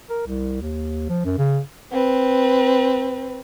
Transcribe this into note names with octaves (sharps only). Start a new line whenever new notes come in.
A#4
C2
D#2
F3
F#2
C#3
C4 B4